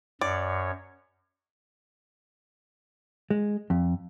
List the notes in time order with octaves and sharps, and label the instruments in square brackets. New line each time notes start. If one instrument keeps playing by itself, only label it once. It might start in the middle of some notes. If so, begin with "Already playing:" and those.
[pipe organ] F#2 C#5 [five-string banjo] D5
[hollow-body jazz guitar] G#3
F2